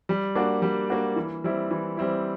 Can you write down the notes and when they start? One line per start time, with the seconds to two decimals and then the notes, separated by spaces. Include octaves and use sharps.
0.09 G3
0.35 A#3 D4 F#4
0.62 G3
0.90 A#3 D4 F#4
1.16 E3
1.44 G3 C4 E4
1.71 E3
1.97 G3 C4 E4